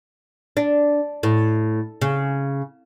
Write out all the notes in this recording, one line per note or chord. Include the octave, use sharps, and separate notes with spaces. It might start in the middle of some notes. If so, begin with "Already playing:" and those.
D4
A2
C#3